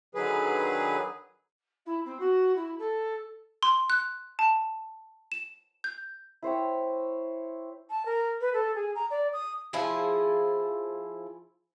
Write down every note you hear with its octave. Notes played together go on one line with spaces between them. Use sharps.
D3 D#3 F#3 G#4 B4
E4
C4
F#4
E4
A4
C6
F#6
A5
E7
G6
E4 C5 C#5 G5
A5
A#4
B4
A4
G#4
A#5
D5
D#6
F3 E4 G#4